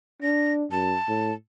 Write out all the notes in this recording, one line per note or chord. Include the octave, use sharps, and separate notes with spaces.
D4 A#6
F#2 A5
A2